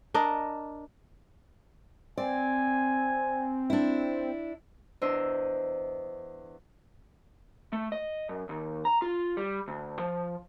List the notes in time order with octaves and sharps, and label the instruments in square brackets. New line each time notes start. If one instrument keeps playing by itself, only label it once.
[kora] D4 A#4 D#5
[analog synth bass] C4 [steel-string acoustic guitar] D5 [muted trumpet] G#5
[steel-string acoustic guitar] D4 E4
[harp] E2 D4 C5 D#5 A#5 E6
[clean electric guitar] A3
D#5
F#2
D#2
A#5
F4
G3
D2
F3